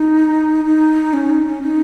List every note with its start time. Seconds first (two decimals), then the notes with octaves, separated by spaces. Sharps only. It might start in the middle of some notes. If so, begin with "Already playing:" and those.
Already playing: D#4
0.65 D#4
1.13 C#4
1.30 D#4
1.46 C#4
1.62 D#4